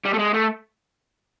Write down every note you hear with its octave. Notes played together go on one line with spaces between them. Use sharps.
G3
A3
G#3
A3